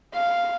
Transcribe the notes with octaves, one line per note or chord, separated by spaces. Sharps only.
F5